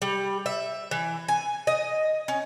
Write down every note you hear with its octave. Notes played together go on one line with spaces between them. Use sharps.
G3
E5
E3
G#5
D#5
C#4